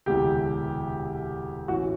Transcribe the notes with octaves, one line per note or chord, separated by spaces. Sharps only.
E1 D2 C3 E3 G4
A1 A2 E3 F#4